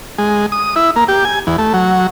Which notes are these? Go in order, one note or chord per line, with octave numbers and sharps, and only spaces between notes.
G#3
D#6
E4
A#3
G4
G#5
E2
A3
F#3